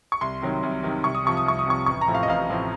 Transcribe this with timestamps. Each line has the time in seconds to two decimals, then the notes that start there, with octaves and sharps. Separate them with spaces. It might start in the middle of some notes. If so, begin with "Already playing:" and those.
0.12 C#6
0.21 C2 C6
0.42 C3 D#3 F#3
0.63 C2
0.83 C3 D#3 F#3
1.04 C2 C#6
1.15 D#6
1.24 C3 F3 C#6
1.37 D#6
1.46 C2 C#6
1.59 D#6
1.66 C3 F3 C#6
1.86 A1 C#6
2.01 A#5
2.08 A2 F3 C4
2.14 F5
2.23 D#5
2.28 A1 F5
2.49 A2 F3 C4